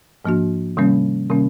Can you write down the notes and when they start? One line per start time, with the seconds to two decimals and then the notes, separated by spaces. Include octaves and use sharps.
0.25 G#2 F3 A#3 D4 F#4
0.77 C3 D#3 G3 A#3 C#4
1.30 C3 D#3 G3 A#3 C#4